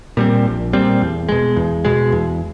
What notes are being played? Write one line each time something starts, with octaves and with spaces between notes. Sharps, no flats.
A#2 G3 C4
A#1
A#2 G3 C4
E2
B2 G#3
E2
B2 G#3
E2